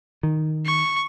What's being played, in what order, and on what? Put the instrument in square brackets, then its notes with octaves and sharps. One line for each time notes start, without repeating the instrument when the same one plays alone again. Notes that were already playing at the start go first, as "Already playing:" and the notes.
[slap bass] D#3
[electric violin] C#6